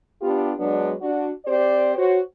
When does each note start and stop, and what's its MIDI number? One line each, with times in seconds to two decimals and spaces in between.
0.22 0.52 59
0.22 0.52 62
0.22 0.52 65
0.22 0.52 67
0.59 0.93 54
0.59 0.93 56
0.59 0.93 59
0.59 0.93 62
1.01 1.29 62
1.01 1.29 66
1.45 1.94 60
1.45 1.94 67
1.45 1.94 72
1.45 1.94 74
1.95 2.18 66
1.95 2.18 72
1.95 2.18 73